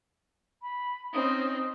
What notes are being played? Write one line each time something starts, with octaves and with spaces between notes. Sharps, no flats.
B5
C4 C#4 D#4 D#6